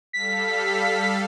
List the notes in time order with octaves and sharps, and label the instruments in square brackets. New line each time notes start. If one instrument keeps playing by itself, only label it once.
[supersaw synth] G3 A4 F5 [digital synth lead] B6